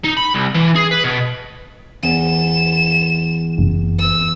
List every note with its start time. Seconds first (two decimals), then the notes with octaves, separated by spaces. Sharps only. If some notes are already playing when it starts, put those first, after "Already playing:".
0.04 D#4
0.17 B5
0.35 C2
0.55 E3
0.76 G#4
0.91 B4
1.04 B2
2.03 E2 E7
3.58 F#1
4.00 E6